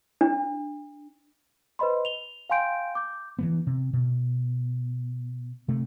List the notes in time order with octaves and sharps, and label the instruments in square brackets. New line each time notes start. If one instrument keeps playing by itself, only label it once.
[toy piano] D4
[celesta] B4 C5 D#5 B5 C6
F7 G7
F5 G5 G#5 C6 G6 D7
D6 G6
[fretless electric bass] E3 F#3 B3
C3
B2
C3 A3